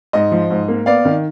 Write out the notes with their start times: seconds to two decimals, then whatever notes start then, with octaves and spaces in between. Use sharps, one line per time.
0.13 G#2 D#5
0.32 F3
0.50 G#2
0.68 A#3
0.86 B3 D5 F5
1.05 D#3